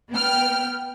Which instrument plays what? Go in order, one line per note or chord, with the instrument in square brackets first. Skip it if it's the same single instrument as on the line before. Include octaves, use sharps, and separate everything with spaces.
[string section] B3 G5 F6